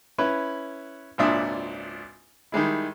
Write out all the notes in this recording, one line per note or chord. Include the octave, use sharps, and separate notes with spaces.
C#4 E4 B4
G#1 C#2 A#2 D4 E5 D#6
D#3 G3 G#3 E4